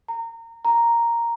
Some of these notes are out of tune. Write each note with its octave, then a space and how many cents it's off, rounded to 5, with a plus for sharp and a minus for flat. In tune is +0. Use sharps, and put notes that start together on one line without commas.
A#5 -25
A#5 +0